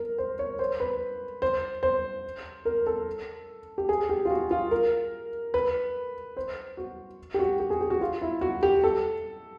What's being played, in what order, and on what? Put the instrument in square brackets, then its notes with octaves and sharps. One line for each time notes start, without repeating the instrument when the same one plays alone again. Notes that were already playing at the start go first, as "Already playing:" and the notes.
Already playing: [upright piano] A#4
C5
C#5
C5
B4
C5
C5
A#4
A4
G4
G#4
G4
F4
F#4
F4
A#4
B4
C5
F#4
G4
F#4
G4
G#4
G4
F#4
F4
E4
F#4
G4
A4